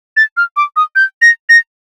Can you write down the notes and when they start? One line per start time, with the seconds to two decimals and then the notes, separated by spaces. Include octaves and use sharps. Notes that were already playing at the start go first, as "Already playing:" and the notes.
0.17 A6
0.37 F6
0.57 D6
0.76 D#6
0.96 G6
1.22 A#6
1.49 A#6